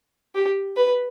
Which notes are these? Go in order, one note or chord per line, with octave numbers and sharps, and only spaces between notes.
G4
B4